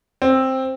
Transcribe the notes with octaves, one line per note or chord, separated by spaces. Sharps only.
C4